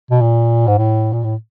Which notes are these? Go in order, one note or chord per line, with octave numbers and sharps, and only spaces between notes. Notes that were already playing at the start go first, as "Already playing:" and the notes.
B2
A#2
G#2
A2
A#2
A2